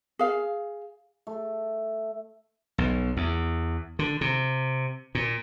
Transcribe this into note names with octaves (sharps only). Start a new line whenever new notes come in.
G#4 F5
A3
B1
E2
D3
C3
A#2